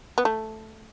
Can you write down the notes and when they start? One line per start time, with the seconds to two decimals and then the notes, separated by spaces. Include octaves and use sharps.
0.18 B3
0.25 A3